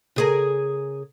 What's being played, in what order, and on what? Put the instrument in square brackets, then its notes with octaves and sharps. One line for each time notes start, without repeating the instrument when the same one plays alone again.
[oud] C#3 G#4 A#4